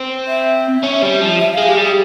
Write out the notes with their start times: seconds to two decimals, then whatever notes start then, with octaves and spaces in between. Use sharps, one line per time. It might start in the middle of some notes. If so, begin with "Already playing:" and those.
Already playing: C4
0.28 E5
0.83 C#4
1.02 G3
1.21 F3
1.39 E5
1.54 G#3 F5
1.67 G4
1.77 G3 G#4